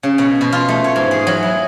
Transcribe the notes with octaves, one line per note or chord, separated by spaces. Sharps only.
C#3
B2
B2
F4
A3
C#5
G#2
G#4
F#3
E4